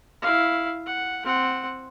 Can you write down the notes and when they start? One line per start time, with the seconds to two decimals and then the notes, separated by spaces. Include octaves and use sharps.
0.22 E4 F5
0.86 F#5
1.25 C4 F#5